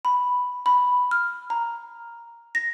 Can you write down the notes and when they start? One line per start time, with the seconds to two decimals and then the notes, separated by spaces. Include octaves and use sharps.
0.05 B5
0.66 B5
1.11 F6
1.50 A#5
2.55 A#6